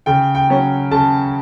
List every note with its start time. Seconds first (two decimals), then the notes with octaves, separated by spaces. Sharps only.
0.06 C#3 G5
0.35 G5
0.49 F#3 C#4
0.91 C#3 A5